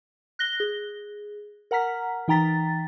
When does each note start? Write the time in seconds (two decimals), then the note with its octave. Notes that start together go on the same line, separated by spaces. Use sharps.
0.39 F#6 A#6 G7
0.60 G#4
1.71 A#4 F#5 A#5 F6 B6
2.28 E3 D#4 G5 A#5 A6 B6